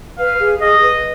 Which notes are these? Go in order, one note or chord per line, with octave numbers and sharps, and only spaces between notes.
B4 F5
G#4
G#4 D#5
B4